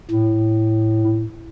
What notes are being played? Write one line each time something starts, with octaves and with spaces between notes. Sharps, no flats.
A2